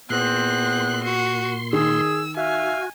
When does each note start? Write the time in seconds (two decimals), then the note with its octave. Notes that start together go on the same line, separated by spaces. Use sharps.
0.10 E2 A#2 B3 C4 C6 F#6
1.04 F#4
1.73 D#3 G#4 E6
2.37 F#4 E5 F5 G#5